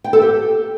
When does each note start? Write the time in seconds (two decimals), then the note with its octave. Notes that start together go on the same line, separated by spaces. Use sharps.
0.04 G5
0.13 A4
0.22 G4